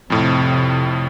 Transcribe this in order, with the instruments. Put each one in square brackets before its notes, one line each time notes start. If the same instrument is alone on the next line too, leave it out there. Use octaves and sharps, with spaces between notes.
[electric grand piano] F2 A2 [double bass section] C3